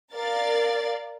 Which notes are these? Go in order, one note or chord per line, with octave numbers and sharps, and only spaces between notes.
A#4 D5 F5 A6